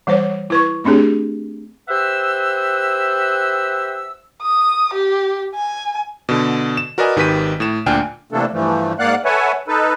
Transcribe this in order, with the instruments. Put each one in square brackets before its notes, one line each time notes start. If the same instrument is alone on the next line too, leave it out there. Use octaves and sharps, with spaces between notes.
[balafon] E3 G3 C5 C#5
E4 B4 C#6
A3 C4 D4 G4 G#4
[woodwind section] G4 B4 C5 E5 F#5 E6
[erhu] D#6
G4
G#5
[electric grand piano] B2 D3
E7
F#4 A#4 B4 D5 D#5 G#5
G#1 D#3 G4 B4 B6 D#7
A2 E7
D2 A#2 D4 G5 G#5 F6
[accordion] C3 E3 A3 A#3 D4 A4
G2 E3 F3 A3
G#2 A#3 D5 F5 F#5 F#6
A4 B4 C#5 E5 F#5 G#5
D#4 A4 B4